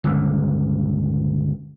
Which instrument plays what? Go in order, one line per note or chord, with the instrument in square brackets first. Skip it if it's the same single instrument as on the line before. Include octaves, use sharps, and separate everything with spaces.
[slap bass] G1 C#2 A#2 D3